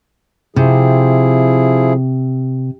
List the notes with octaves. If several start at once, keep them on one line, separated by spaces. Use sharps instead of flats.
C3 F3 E4 G#4